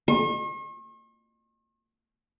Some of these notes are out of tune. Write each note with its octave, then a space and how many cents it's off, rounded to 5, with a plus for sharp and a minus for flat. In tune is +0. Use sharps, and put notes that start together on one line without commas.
C#6 -45